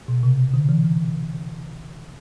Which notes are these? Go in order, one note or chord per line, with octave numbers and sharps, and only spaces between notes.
B2
C3
D3
E3
E3